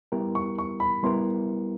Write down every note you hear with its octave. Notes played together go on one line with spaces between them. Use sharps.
G3 B3 E4 G4 A#4
C#6
C#6
B5
G3 B3 E4 G4 A#4 C6